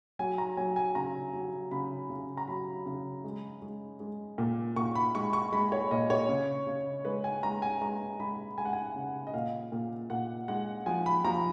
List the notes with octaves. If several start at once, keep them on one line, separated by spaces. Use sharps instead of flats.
F#3 G#5
A#5
F#3 G#5
G#5
C#3 A#5
F#3
C#3 B5
C#3
A#5
F#3 B5
C#3
G#3
G#3
G#3
A#2
A#2 C#6
B5
G#3 C#6
C#6
G#3 B5
C#5
A#2 D#5
C#5
C#3
C#3
G#3 B4
G#5
G#3 A#5
G#5
G#3 A#5
G#3 B5
G#3 G#5
F#5
G#5
C#3
D#5
A#2 F5
A#2
A#2 F#5
G#3 F#5
F3 G#5
B5
F3 A#5